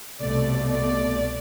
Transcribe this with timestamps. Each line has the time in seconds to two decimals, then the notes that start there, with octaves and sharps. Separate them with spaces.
0.21 C2 B2 A3 D5
0.69 D5